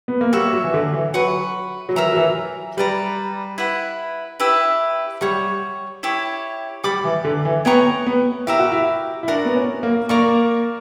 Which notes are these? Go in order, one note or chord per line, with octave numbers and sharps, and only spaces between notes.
B3
A#3
G3 F#4 C#5 E5
F#3
E3
D3
E3
F#3 B4 F#5 C#6
F#3
E3 A#4 E5 A#5
F#3
E3
G3 B4 D5 A#5
E4 B4 F#5
E4 G4 B4 E5
G3 C#5 F#5 C#6
E4 G4 C#5
G3 D5 F#5 B5 D6
E3
D3
E3
B3 C#5 G5 A#5 C#6
B3
E4 G4 A#4 E5 A#5
F#4
E4
E4
D4 F#4 A#4 D5
B3
C#4
A#3
A#3 D5 A#5 C#6